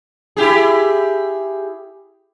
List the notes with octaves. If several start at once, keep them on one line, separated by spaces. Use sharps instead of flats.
E4 G4 G#4